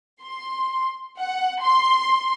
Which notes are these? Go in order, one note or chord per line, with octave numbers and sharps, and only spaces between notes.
C6
F#5
C6